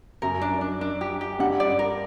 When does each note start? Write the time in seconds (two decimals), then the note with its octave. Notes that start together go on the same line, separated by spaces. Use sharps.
0.22 F#2 A#4
0.41 D4
0.61 D4
0.81 D4
1.01 G4
1.21 G4
1.39 G2 F#5
1.60 D5
1.79 A#4